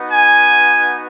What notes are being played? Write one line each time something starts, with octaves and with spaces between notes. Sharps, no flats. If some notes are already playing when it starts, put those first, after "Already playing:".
Already playing: B3 D#4 F#4
G#5